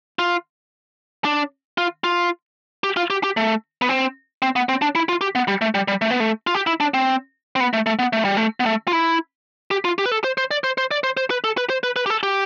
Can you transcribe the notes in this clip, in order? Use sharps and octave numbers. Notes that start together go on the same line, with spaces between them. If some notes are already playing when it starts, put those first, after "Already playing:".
F4
D4
F4
F4
G4
F4
G4
G4
A3
B3
C4
C4
B3
C4
D4
E4
F4
G4
B3
G3
A3
G3
G3
A3
B3
A3
F4
G4
E4
D4
C4
C4
B3
A3
A3
B3
A3
G3
A3
B3
A3
F4
E4
G4
F4
G4
B4
A4
C5
C5
D5
C5
C5
D5
C5
C5
B4
A4
B4
C5
B4
B4
G4
A4
G4